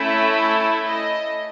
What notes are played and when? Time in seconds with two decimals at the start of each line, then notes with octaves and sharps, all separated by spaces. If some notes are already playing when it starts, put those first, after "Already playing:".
Already playing: A3 C#4 E4 A4 E5
0.86 D#5